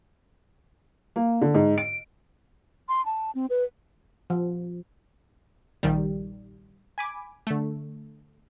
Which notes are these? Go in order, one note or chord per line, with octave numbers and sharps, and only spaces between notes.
A#3
D3
G#2
D7
C6
A5
C4
B4
F3
A#1 D#3 G3
G#5 B5 D6
D3 A3